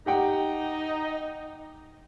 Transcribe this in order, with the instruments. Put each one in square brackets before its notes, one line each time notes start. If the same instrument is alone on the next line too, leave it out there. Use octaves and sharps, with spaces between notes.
[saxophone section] D#4 [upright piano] G4 F#5 G5